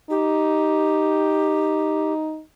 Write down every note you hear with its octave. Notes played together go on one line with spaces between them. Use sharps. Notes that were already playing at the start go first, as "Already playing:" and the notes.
D#4 G4